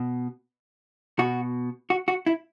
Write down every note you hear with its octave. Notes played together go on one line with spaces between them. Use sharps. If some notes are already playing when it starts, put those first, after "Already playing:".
Already playing: B2
B2 F#4
F#4
F#4
E4